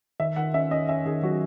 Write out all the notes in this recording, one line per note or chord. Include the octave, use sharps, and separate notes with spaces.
D#3 E5
D#3 F#5
C#4 E5
C#4 D#5
C#4 E5
D#3 G#4
F#3 F#4